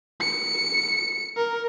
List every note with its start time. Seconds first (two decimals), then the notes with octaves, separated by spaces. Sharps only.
0.21 C#7
1.37 A#4